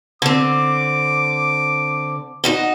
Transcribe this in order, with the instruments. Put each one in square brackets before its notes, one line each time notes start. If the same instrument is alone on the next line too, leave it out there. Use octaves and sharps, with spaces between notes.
[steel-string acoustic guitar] D3 C4 [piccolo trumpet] D6
[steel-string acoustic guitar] D#4 F#4 D#5